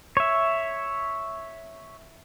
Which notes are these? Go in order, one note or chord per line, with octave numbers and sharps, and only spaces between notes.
C#5 E5